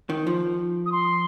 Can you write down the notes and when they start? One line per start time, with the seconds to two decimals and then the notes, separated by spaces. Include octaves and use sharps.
0.10 D#3
0.27 F3
0.86 D#6
0.92 C6